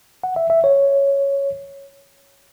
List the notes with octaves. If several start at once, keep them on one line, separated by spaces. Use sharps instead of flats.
F#5
E5
E5
C#5